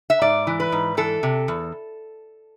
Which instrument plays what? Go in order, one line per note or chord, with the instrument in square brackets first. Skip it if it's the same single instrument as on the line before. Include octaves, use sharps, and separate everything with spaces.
[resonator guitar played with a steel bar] E5
G#2 D5
E3
B4
G#2
E3 A4
C3
E2